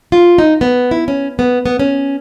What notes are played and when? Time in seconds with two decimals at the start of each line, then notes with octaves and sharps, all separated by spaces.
0.12 F4
0.38 D#4
0.61 B3
0.91 E4
1.08 C#4
1.39 B3
1.66 B3
1.79 C#4